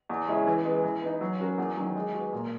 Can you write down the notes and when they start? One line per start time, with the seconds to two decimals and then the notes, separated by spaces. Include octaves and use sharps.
0.09 E2
0.28 C#3 G#3 C#4 E4
0.47 E3
0.65 G#3 B3
0.84 E3
1.02 B3 D#4
1.21 F#3
1.39 C#4 F#4 A#4
1.58 E2
1.77 D#3 F#3
1.95 G#3
2.14 B3 F#4
2.33 A#2